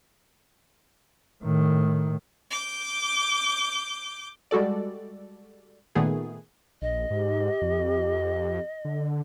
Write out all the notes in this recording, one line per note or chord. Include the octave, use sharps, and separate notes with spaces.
A2 D#3
D6 G6
G3 G#3 F#4 A4 D5
A#2 D#3 A3 B3 G#4
A#1 D#5
G#2 G4
F2
D3